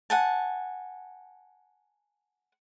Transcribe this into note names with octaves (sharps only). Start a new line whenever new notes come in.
F#5 G#5 A5